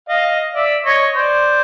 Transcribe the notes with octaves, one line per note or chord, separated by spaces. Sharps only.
D#5 F5
D5 E5
C#5 D#5
C5 D5